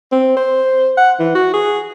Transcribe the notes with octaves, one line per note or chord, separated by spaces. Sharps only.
C4
C5
F#5
E3
F#4
G#4